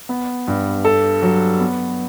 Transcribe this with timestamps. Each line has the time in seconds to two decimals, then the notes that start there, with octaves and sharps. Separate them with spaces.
0.09 B3
0.47 G2
0.85 A4
1.22 F#3
1.60 B3